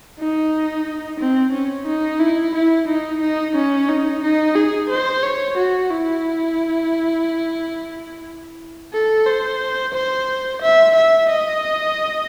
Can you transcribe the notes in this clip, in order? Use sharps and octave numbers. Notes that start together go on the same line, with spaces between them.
D#4
C4
C#4
D#4
E4
E4
D#4
D#4
C#4
D#4
D#4
G#4
C5
C#5
F#4
E4
A4
C5
C5
E5
E5
D#5